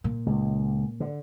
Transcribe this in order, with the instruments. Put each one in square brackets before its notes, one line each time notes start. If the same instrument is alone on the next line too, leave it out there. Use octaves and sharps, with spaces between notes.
[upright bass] A#2
[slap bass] C#2
D3